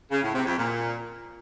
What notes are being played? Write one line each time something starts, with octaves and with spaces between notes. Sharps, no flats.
C#3
A2
C3
F2
A#2